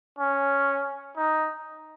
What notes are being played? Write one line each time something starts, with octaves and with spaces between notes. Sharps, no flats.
C#4
D#4